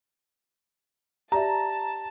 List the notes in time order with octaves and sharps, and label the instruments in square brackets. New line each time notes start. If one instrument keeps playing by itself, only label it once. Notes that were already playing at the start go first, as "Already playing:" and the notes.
[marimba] G4 D5 E5 [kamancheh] A5 [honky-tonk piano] A#5